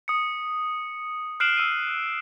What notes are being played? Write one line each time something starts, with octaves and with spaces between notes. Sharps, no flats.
D#6 C#7
F6 F#6 C7 D7 E7 F#7
E6 D#7